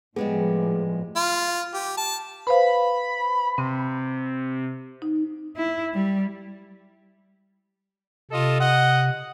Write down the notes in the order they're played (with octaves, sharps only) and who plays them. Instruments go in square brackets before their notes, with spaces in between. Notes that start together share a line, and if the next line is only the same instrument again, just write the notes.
[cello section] A2 F3 [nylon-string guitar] G3 G#3 B3 [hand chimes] G#4
[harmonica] F4
G4
A5
[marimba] B4 C5 F5 [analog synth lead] B5
[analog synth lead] C3 [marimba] C4
[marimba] D#4
[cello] E4
G3
[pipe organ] C3 [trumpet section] F4 A4 D#5
[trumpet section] D#5 F#5